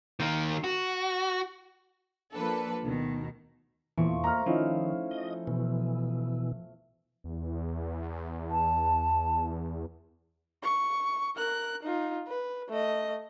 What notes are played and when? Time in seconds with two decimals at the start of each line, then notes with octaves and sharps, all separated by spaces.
0.20 D#3 A#3
0.64 F#4
2.33 F3 A#3 D4 A4 B4
2.82 D2 B2 D#3
3.98 E2 A#2 E3 F3 A3 C#6
4.24 A#3 A#5 F6
4.46 D#3 F3 C#4 D#4 E4 F5
5.11 D#5
5.47 B2 E3
7.24 E2
8.50 A5
10.63 C#6
11.36 A#4 F#6
11.82 D#4 F4
12.27 B4
12.69 A3 D#5